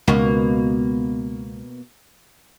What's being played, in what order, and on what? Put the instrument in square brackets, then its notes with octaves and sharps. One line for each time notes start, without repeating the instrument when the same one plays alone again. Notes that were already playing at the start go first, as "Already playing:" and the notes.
[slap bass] C#2 [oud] B2 A#3 B3